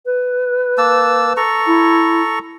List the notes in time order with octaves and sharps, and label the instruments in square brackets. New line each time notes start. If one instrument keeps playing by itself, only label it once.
[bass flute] B4
[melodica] A#3 A5 E6
A4 A#5 C#6
[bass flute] E4